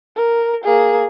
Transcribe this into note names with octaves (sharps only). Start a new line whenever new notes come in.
A#4
A#3 G#4